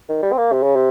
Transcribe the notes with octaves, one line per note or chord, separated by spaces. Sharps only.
D#3
G3
C4
A#3
C3
C#3
C3